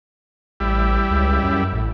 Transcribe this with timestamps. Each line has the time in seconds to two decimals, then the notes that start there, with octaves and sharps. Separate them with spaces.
0.60 A1 G3 E4
1.10 C#2
1.43 F#2
1.72 A1